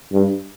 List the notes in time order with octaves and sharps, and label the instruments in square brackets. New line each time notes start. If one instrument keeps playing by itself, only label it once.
[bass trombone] G2